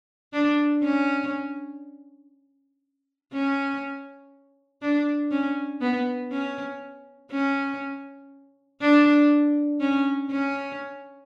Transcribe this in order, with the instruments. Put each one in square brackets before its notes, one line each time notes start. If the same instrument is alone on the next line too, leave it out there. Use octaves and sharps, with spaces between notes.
[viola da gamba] D4
C#4
C#4
D4
C#4
B3
C#4
C#4
D4
C#4
C#4